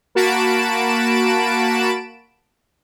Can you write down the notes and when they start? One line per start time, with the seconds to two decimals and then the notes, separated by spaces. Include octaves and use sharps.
0.15 A#3 F#4 A5 B5 D7 E7